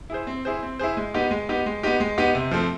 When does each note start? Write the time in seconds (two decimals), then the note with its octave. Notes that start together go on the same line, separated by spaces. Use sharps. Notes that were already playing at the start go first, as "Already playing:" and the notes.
0.10 E4 G#4 C5
0.27 C4
0.45 E4 G#4 C5
0.63 C4
0.79 E4 G#4 C5
0.97 G#3
1.14 B3 D#4 G4
1.31 G#3
1.49 B3 D#4 G4
1.66 G#3
1.83 B3 D#4 G4
2.00 G#3
2.18 B3 D#4 G4
2.35 C3
2.51 F3 A3 C4